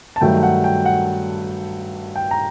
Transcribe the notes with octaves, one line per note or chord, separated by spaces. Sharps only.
A5
G2 D#3 F#3 A3 G5
F#5
G5
F#5
G5
A#5